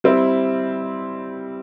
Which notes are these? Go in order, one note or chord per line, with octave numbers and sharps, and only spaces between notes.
G3 C4 E4